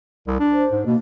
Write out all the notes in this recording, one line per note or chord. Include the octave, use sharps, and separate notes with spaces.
C2
D4
C5
G#2
B2 A#3